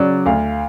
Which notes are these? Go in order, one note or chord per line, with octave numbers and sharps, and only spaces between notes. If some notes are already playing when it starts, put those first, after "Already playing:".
Already playing: C#3 F#3 D5
D2 F5